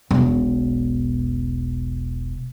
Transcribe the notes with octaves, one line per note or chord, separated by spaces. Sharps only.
E1 B1